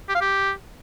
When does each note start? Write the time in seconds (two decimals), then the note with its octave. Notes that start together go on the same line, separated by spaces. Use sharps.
0.09 G4
0.15 F5
0.21 G4